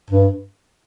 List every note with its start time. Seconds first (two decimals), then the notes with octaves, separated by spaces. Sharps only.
0.10 G2